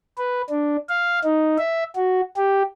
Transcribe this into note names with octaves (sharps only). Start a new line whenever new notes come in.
B4
D4
F5
D#4
E5
F#4
G4